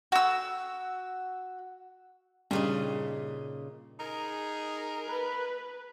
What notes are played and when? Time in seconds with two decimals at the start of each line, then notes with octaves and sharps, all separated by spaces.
0.12 F#4 E6
2.51 G2 A#2 C#3 D#4
4.00 D#4 G#4 A#4
5.07 B4